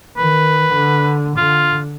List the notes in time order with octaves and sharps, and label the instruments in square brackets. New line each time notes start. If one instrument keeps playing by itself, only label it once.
[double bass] D#3 [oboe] B4
[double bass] D3
[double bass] D3 [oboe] F4